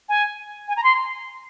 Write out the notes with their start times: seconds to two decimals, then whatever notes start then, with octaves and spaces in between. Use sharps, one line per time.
0.09 G#5
0.68 G#5
0.77 A#5
0.84 C6